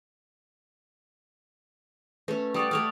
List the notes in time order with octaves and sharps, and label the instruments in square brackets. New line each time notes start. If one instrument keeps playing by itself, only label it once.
[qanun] A3 C#4 [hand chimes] B4
[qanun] G3 D5 F#5 [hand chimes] C#6 D#6 A6
[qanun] A3 C#5 D5 [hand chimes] D#6 F6